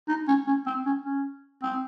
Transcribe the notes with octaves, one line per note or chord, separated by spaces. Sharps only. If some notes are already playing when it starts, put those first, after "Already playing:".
D#4
C#4
C#4
C4
C#4
C#4
C4